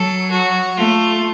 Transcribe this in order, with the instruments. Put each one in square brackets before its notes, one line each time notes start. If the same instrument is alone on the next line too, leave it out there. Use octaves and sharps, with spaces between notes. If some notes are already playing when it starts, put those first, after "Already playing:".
Already playing: [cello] F#3 [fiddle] A4
[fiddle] F#4
[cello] A3 [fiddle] F4